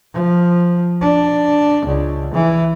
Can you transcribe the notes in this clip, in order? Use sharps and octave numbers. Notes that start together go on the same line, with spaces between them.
F3
D4
C#2
E3